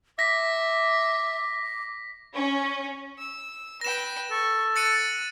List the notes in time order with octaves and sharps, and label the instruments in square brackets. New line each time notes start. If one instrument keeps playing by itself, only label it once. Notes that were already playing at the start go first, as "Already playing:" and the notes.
[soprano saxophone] E5 [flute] D6 [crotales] A#6 B6
[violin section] C#4
[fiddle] E6
[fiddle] B4 G5 [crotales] A#6 E7
[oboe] A4 [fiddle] C#6
[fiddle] F#6 [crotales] A6 C#7 D#7